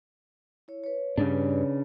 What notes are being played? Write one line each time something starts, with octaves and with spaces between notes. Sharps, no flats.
E4 C#5
B4 C#5
G2 C#3 D4